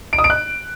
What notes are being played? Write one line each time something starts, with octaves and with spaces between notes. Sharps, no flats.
D7
D#6
D7
F#6